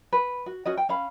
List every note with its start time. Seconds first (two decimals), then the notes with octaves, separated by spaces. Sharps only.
0.13 B4
0.46 F#4
0.66 C#4 F#4 D#5
0.77 G5
0.89 C#4 F5 B5